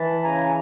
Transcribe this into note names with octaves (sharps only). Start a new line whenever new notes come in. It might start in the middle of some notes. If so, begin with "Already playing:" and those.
Already playing: E3 A5 B5
C#3 G#5 A#5